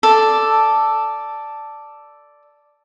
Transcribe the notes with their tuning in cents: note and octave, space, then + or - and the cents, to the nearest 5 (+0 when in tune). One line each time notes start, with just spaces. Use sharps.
A4 +0 D5 +0